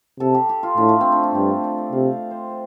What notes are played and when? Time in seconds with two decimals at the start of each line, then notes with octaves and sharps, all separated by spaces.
0.20 C3 A4
0.34 G4
0.49 G4
0.63 F4
0.78 A2 D4
0.89 A3
1.01 C4
1.12 D4
1.23 F4
1.35 G2 G4
1.49 A4
1.64 D5
1.78 D5
1.92 C3 F5
2.31 C5
2.50 C5